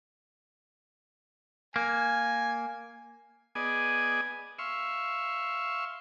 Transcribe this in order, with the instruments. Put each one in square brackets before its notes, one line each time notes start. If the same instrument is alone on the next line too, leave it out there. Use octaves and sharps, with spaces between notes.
[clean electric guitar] A#3 [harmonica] G#5
[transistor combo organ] B3 G#4 D5 D#5 G#5
E5 F5 C6 C#6